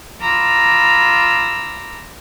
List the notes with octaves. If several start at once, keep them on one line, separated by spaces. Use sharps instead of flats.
F4 A#5 B5 D6 E6